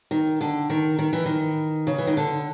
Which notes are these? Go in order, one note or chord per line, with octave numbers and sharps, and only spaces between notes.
D#3
D3
D#3
D#3
E3
D#3
C#3
E3
D#3
D3